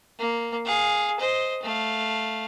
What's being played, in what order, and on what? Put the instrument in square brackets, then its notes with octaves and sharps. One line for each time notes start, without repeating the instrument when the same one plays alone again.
[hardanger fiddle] A#3
G#4 F5
C5 D#5
A3 F5